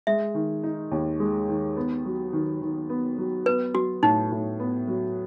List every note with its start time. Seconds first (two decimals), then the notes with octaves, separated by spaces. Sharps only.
0.07 G#3 E5
0.35 D#3
0.63 D#4
0.91 D#2
1.20 G#3
1.48 D#3
1.77 B3
2.05 F#3
2.33 D#3
2.61 D#3
2.90 B3
3.18 F#3
3.46 B3 B4
3.74 F#3 F#4
4.03 A2 D#4
4.32 A2
4.60 B3
4.88 F#3